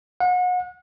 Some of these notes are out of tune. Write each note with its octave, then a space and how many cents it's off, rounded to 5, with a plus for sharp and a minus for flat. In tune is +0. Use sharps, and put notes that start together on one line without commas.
F#5 -35